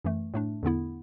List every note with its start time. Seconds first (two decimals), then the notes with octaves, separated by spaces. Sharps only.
0.05 F#2 E3 A3
0.34 A2 A3 D4
0.63 E2 D3 B3 E4